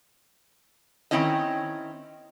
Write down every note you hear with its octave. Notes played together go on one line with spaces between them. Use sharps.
D#3 E3 C4 C#4 E4 D#5